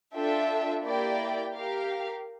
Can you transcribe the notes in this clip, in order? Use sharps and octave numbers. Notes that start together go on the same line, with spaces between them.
D4 F4 A4 E5 G5
A#3 E4 G4 D5 G5
G4 A#4 F5